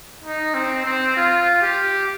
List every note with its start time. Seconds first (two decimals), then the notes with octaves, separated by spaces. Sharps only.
0.24 D#4
0.54 C4
0.85 C4
1.16 F4
1.62 G4